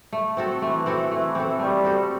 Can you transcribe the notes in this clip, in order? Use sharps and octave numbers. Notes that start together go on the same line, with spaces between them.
A3
C4 F#4 A4
E3 A3
C4 F#4 A4
E3 A3
C4 F#4 A4
G3 A3
C4 F#4 A4